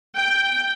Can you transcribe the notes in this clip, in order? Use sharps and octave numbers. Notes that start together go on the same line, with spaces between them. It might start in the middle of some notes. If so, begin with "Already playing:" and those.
G5